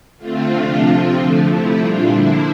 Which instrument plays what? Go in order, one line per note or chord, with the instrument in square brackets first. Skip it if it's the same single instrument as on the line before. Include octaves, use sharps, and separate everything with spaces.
[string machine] D3 A3 C4 F4
C3 F3 A3 D4
C3 F3 C4
D3 F3 A3
C3 F3 A3 E4
A#2 G3 D4 F4
D3 F3 A#3 D4 E4